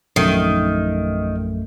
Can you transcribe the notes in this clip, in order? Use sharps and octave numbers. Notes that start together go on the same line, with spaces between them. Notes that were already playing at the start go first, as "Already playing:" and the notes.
A#1 F#2 D#3 A3